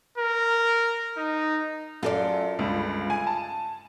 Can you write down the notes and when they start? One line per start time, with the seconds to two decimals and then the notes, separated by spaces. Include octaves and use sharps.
0.18 A#4
1.18 D#4
2.03 F#2 F4 A4 D5
2.59 G1 C#2
3.10 G#5
3.27 A5